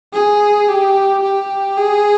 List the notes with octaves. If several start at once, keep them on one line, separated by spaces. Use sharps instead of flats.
G#4
G4
G4
G#4